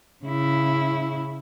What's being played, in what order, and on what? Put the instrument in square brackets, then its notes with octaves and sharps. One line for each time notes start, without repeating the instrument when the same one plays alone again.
[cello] C#3 E4